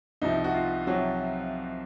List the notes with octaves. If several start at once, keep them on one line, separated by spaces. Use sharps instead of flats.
C2 C3 F3 D#4
F#4
F4
C3 F3 F#3 F#4